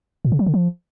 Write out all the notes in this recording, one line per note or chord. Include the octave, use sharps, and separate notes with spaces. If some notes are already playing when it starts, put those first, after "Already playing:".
A#2
C#3
F#3
D3
F3